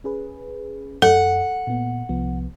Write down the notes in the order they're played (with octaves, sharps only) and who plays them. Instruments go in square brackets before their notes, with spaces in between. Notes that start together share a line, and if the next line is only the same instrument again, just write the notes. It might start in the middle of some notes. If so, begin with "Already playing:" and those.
[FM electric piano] C#4 G#4 B4
[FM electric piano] F#2 D#5 [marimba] A4 [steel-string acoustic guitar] F#5
[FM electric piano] A#2 B3
C2 F3 B3